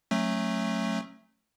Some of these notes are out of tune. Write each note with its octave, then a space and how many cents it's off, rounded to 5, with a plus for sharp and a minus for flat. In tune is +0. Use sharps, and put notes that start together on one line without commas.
F#3 -10 A3 +0 C#4 -35